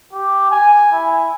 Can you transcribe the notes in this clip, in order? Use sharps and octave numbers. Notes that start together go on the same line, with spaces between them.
G4
G#5
E4